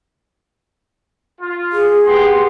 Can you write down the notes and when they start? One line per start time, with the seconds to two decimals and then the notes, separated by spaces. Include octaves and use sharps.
1.41 F4
1.72 G#4
2.05 B3 G4 C6